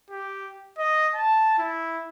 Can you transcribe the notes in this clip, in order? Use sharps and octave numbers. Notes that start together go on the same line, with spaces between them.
G4
D#5
A5
E4